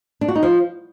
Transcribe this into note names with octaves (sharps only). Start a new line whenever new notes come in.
D4
F#4
D#4
F3